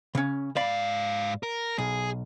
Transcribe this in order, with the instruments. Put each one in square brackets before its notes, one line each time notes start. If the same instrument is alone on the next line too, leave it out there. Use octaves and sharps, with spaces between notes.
[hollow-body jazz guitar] C#3 C#4
[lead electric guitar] G#2 F5 [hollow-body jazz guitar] D5 B5
[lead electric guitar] A#4
[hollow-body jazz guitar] B1 [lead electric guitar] G#4